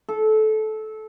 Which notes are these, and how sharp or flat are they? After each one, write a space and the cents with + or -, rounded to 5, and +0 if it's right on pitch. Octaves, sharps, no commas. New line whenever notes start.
A4 -20